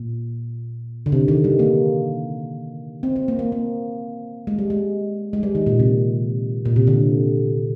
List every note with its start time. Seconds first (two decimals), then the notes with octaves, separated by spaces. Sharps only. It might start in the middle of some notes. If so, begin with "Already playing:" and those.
Already playing: A#2
1.06 D3
1.12 C3
1.28 D#3
1.44 G3
1.59 A#3
3.03 C4
3.16 C4
3.28 A#3
3.39 A#3
3.52 A#3
4.47 G#3
4.59 G3
4.70 G#3
5.33 G#3
5.43 G3
5.55 D#3
5.66 A#2
5.79 C3
6.65 A#2
6.76 C3
6.87 D3